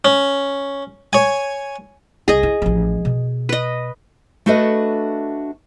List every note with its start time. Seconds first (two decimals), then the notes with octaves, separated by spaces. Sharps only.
0.05 C#4
1.13 C#5 G#5
2.28 C2 G#4 D#5
2.43 E4
2.62 A1 F3
3.05 B2
3.49 B4 D#5
4.46 A3 D4 F#4 A4 B4 D#5